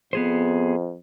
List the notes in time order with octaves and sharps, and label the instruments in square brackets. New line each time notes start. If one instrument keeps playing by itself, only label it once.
[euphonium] F2 [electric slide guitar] B3 G#4 C5